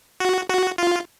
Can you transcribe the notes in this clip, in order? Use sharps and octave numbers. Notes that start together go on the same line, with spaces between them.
F#4
F#4
F4